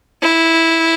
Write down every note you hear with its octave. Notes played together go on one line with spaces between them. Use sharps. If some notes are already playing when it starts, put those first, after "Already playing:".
E4